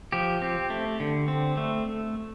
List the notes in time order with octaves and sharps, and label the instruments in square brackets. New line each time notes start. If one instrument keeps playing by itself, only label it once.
[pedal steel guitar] F3 G4
C4
A3
D3
C4
A3